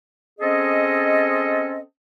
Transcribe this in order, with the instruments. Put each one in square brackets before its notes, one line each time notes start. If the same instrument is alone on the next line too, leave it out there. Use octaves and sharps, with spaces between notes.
[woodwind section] C4 C#4 G#4 A4 D#5